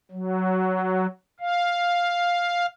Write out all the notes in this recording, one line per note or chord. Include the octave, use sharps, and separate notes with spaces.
F#3
F5